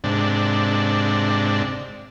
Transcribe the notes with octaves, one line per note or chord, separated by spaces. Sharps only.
G#2 C3 D4